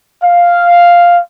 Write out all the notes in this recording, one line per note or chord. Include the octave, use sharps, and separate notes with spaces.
F5